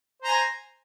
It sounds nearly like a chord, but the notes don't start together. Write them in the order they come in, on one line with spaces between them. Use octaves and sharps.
C5 A#5 G#5